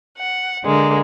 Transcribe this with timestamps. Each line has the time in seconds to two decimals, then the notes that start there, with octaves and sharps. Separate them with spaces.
0.17 F#5
0.63 D3 G#3 A#3